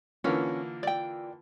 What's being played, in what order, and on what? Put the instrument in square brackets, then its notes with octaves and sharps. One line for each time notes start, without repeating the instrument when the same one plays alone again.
[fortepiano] D3 E3 A#3 [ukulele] C#4 [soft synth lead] F4
[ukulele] D5 G5